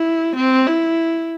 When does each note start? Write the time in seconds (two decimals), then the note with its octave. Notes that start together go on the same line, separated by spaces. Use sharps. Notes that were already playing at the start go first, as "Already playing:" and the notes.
Already playing: E4
0.36 C4
0.67 E4